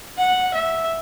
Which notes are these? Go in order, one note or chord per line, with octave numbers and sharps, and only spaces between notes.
F#5
E5